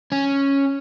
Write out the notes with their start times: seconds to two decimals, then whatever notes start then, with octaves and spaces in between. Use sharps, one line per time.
0.12 C#4